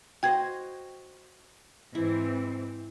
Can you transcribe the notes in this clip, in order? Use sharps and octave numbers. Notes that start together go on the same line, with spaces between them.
F#4 C5 D#5 G5 G#6
G#2 E3 C4 E4